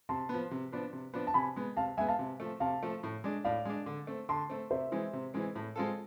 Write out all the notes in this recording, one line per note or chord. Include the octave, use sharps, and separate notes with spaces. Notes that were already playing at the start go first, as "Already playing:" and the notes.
C3 A5 C6
F3 B3
C3
F3 B3 D4
C3
F3 B3 D4
A5
C3 G#5 B5
G#3 B3
C3 F5 A5
G#3 B3 E5 G#5
F5 A5
C3
F3 A3
C3 F5 A5
F3 A3
A2
G#3 D4
A2 D5 F5
G#3 D4
D3
A3 C4
D3 A5 C6
A3 C4
C3 C5 E5
E3 G#3 C4
C3
E3 G#3 C4
A2
G#3 C4 F4 A4